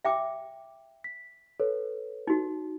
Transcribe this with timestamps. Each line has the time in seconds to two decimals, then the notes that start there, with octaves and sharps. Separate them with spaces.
0.05 E5 G5 D6
1.04 B6
1.60 A4 B4 C#5
2.27 D#4 F#4